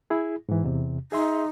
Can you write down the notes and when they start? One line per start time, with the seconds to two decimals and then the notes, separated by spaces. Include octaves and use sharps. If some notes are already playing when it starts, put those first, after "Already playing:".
0.10 E4 G#4
0.49 G#2 E3
0.64 E2 C3
1.12 D#4 G#4 E5 C6